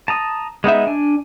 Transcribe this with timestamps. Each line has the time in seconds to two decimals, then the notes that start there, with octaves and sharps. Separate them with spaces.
0.08 A5 A#5 D#6
0.64 G#3 B3 D#4 E5
0.87 D4 G#5